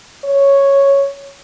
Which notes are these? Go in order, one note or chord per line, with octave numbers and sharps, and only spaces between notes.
C#5